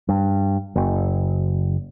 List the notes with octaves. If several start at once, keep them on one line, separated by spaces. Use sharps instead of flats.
G2
F#1